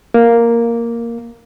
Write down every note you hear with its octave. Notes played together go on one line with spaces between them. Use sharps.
A#3